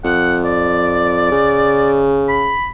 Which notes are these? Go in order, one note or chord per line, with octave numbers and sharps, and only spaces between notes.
F2 F#5
D5
C#3
B5